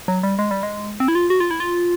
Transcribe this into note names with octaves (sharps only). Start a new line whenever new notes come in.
F#3
G3
G#3
G3
G#3
C4
E4
F4
F#4
F4
E4
F4